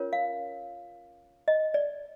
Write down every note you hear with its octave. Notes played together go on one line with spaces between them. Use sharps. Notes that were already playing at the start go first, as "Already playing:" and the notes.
Already playing: C#4 F4 A#4 C#5
F5
D#5
D5